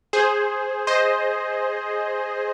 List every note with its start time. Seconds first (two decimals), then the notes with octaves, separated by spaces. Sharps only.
0.13 G#4 C5
0.87 C5 D#5